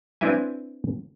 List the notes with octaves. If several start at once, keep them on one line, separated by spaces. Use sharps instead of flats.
C4 D4 E4 B4 E5 G#5